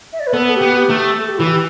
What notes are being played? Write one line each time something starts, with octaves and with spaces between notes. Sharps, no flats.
E5
D5
B4
B3 A4
G4
B3
G4
A3
G4
A4
G4
E3 E4
G4